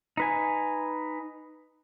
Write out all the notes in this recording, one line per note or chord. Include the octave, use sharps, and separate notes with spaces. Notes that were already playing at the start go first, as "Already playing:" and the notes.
D#4 B4 G#5